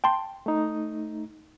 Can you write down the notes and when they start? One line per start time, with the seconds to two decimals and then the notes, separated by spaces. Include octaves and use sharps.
0.04 G5 A5 C6
0.46 A3 D#4